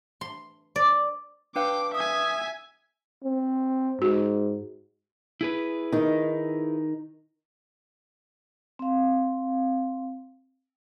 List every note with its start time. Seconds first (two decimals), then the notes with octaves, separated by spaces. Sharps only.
0.21 C6
0.76 D5
1.56 D4 B4 F5 G5 D6
1.94 E5 G#5 D#6
3.24 C4
4.02 G#2 F#4
5.41 E4 G#4 B4
5.92 D#3 D#4
8.79 C4 F5